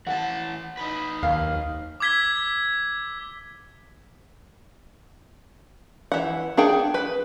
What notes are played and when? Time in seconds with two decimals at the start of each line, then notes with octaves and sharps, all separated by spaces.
0.07 E3 F#5 A5
0.77 D#4 B4
1.23 D#2 F5
2.00 D6 E6 G#6 B6 G7
6.12 E3 F#5
6.57 D4 G#4 F#5 G5
6.94 B4